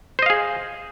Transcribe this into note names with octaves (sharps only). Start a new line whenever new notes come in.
G#4 C5 D#5 F5